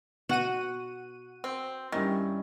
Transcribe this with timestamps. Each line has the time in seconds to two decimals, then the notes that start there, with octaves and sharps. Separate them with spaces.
0.29 B2 F#4 F#5 D#7
1.44 C4
1.92 G2 D#3 C#4 E4